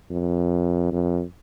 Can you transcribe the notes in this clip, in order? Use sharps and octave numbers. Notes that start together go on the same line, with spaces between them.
F2
F2